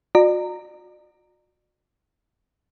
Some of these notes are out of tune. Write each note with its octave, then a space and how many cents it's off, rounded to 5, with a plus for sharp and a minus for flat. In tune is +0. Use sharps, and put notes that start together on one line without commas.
F#4 -40 D5 +40 A#5 -20